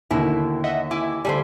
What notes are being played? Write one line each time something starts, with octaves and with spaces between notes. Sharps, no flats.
D#2 B2 D3 A#3 E4
D#5 E5 F#5
E4 G#5 D6
D3 G3 A3 C5 G#5